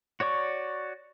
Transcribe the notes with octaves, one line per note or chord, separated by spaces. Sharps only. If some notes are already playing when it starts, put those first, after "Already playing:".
F#4 C#5 D5 C#6